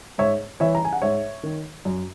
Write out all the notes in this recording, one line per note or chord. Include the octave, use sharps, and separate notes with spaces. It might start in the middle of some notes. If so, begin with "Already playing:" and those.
G#2 C#5 E5
E3 C#5 E5
A#5
G#5
F#5
G#2 C#5 E5
D#3
F#2